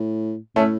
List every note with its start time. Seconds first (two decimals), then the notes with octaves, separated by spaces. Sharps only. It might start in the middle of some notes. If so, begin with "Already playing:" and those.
Already playing: A2
0.56 A2 A3 C#4